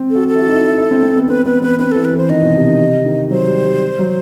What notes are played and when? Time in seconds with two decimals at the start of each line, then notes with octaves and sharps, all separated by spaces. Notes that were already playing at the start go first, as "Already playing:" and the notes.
Already playing: C4
0.10 F#4 A4
0.28 A4
0.35 E4
0.39 F#4
0.47 D#4
0.52 E4
0.65 E4
0.78 E4
0.91 C4
1.03 C4
1.16 B3
1.28 C4 B4
1.45 B3 B4
1.62 B3 B4
1.79 C4 B4
1.92 E3 A4
2.05 B4
2.13 E3 C5
2.30 D#3 D#5
2.42 B2
2.56 C3
2.68 D#3
2.81 C3
3.06 D#3
3.31 F#3 C5
3.47 G3
3.65 G3
3.99 F#3